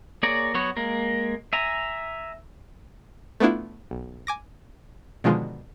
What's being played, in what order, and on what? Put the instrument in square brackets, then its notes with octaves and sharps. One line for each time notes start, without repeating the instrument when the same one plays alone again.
[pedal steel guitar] A#3 G#4 C#5 D5 A#5
F#3 B3 F#4 C#5
G#3 A#3 A#4
E5 G#5 A#5
[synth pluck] A3 B3 D4 E4 F4
B1
G#5 D6 A#6
B2 D3 D#3 F3 G#3 F4